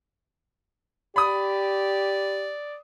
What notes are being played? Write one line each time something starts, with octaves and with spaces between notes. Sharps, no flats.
G4 D5 B5 D#6